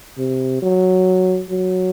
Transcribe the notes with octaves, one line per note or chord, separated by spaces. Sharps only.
C3
F#3
F#3